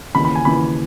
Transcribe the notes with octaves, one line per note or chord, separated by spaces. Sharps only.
D#2 C#3 E3 B5
B5
G#5
D#2 C#3 E3 B5